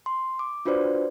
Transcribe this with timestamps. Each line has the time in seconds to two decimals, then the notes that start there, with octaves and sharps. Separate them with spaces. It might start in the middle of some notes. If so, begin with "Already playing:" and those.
0.06 C6
0.39 D6
0.65 D4 F4 F#4 B4 C5 D5